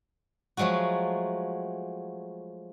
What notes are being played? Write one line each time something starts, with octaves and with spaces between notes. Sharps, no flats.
F3 F#3 G#3 A3 F#4